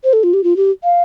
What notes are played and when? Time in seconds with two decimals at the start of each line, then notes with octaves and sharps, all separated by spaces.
0.04 C5
0.13 A4
0.23 F4
0.34 G4
0.44 F4
0.57 G4
0.84 F5